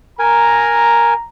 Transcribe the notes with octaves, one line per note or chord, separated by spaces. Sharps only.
A#4 G#5 A#5